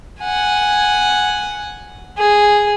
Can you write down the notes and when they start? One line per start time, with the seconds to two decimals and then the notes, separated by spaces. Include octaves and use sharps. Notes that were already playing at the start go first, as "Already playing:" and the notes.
0.22 F#5 G#5
2.18 G#4